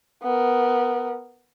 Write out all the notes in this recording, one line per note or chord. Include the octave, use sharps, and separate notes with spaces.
B3 A#4